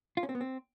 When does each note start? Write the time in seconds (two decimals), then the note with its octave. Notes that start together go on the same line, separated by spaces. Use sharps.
0.17 F4
0.23 C#4
0.29 C4
0.35 B3
0.41 C4